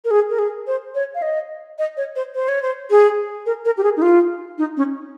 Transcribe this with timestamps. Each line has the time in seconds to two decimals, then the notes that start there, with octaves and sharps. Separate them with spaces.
0.05 A#4
0.11 G#4
0.30 A#4
0.39 G#4
0.67 C5
0.95 C#5
1.15 F5
1.22 D#5
1.79 D#5
1.97 C#5
2.16 C5
2.35 C5
2.48 C#5
2.62 C5
2.90 G#4
3.46 A#4
3.65 A#4
3.77 G4
3.84 G#4
3.97 D#4
4.02 F4
4.58 D#4
4.77 C#4